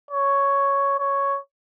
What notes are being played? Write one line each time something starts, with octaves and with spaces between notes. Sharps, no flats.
C#5
C#5